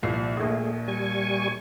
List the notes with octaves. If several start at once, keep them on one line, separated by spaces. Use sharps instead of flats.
C2 A#2 F3 C7
A#1 D#2 A3 G#4
G3 G#5 C#6